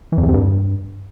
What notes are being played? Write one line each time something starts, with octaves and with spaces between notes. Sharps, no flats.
E3
F2
E2
C3
G2